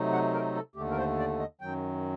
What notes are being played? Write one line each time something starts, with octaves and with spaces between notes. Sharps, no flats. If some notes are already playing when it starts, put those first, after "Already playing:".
Already playing: C3 F#3 A3 D#4
F#5
A#4
A4
D#2 D3 A3 G4
A#4
C5
D5
D#5
F#2 D#3 F#3 G5